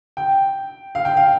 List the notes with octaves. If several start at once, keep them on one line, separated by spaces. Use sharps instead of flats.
G5
F5
G5
F5